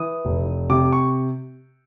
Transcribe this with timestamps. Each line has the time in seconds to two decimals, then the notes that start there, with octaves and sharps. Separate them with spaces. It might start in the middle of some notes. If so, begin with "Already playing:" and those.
Already playing: E3 D#6
0.25 F1
0.70 C3 D6
0.92 C#6